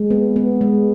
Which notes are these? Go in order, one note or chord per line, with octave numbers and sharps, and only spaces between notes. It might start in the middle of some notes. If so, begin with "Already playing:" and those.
Already playing: G#3
B3
B3
G#3